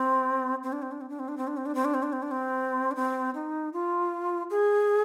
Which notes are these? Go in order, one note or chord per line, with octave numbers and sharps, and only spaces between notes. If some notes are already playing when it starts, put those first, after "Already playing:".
Already playing: C4
C4
D4
C4
D4
C4
D4
C4
D4
C4
D4
C4
D4
C4
D4
C4
D4
C4
D4
C4
D4
C4
D#4
F4
G#4